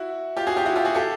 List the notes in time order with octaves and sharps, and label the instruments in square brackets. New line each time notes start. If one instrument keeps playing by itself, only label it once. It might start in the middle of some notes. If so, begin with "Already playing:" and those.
Already playing: [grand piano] E4 F#4
F4 G4
F#4 G#4
F4 G4
E4 F#4
F4 G4
F#4 G#4
G4 A4